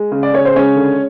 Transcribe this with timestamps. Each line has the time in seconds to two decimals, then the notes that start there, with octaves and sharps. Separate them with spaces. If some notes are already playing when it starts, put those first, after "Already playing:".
Already playing: G#3
0.12 C#3
0.23 D5
0.33 C#3 C#5
0.45 C5
0.55 G#3 C#4 C#5
0.76 D3